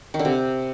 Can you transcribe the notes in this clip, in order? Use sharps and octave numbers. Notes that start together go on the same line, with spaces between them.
D#3
D3
C3